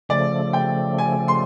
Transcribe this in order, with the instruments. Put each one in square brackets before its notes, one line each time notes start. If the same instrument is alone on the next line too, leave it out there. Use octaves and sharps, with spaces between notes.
[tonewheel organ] C#3 F3 A3 [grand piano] D5
[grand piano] G5
G#5
C6